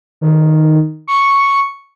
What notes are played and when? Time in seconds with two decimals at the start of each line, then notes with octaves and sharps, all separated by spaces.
0.21 D#3
1.08 C#6